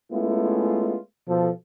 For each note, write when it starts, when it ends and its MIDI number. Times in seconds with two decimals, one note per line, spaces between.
0.11 0.96 56
0.11 0.96 57
0.11 0.96 59
0.11 0.96 61
0.11 0.96 64
0.11 0.96 65
1.28 1.49 47
1.28 1.49 53
1.28 1.49 69